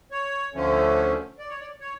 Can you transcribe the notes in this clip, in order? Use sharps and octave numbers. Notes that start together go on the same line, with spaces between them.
C#5
D2 D3 F3 A3 C#4
D5
C#5
D5
C#5